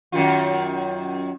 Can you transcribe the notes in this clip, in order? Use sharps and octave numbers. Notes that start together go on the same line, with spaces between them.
F#2 D#3 F4